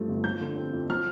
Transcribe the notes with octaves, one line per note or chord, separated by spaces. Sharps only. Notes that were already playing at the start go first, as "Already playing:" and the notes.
Already playing: G2 F3 A3
G1
F3 G6
D3
C4
F2
F3 F6